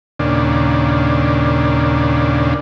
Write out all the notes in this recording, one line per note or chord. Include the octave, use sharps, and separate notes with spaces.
D#2 A#2 C#3 D4